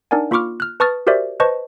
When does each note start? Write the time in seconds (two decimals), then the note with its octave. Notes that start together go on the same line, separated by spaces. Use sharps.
0.11 D4 D#4 A#4 D5 F#5 G#5
0.31 A#3 F4 B5 C#6 D6 F6
0.60 F6 F#6
0.80 B4 A5 C#6 D#6 F6 A6
1.07 F#4 G4 A#4 C5 D5 E5
1.40 B4 C5 D#5 A5 C#6